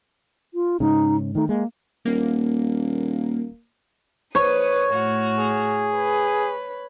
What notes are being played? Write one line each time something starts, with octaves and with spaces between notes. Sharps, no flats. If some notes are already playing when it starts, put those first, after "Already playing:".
F4
G#2 C#3 D#4
D#3 A3 D#4
G#3 A#3
D#1 A#3
B4 C#5 D#6
A2 F#4 F6
G#4
B4